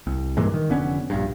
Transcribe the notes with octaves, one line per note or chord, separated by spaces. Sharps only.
C2
G2 A#2 E3 G#3
D#3
F1 D3 B3 C#4
A#1 G2